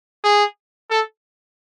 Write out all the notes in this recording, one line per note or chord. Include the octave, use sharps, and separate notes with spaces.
G#4
A4